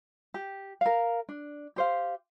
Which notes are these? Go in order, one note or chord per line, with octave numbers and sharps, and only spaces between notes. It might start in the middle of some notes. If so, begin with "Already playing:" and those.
G4
A#4 F5
D4
G4 C5 F5